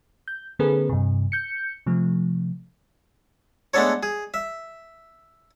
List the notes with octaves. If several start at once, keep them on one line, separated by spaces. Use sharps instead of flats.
G6
D3 A#3 C4 G#4 A4 B4
G2 C3
G6 C#7
C3 F3 A3
G#3 A3 B3 D4 A4 C#5
G#4
E5